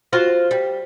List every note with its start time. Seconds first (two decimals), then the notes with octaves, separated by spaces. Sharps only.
0.13 F4 F#4 C5
0.51 G3